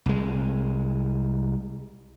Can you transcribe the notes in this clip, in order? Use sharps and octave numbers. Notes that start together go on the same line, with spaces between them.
C2 G#3